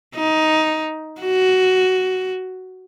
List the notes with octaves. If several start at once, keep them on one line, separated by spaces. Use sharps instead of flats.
D#4
F#4